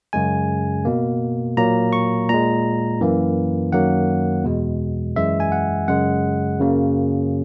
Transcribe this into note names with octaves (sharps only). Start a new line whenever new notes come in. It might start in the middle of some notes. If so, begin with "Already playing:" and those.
F#2 C#3 G#3 G#5
B2 A#3
A#2 F#3 A#3 A#5
C#6
A#2 G#3 A#5
F#2 E3 A#3
F#2 D#3 F#3 A#3 F#5
E2 B2 G#3
F#2 E3 G#3 E5
G#5
F#5
F#2 C#3 G#3 F#5
F#2 C#3 F#3 A#3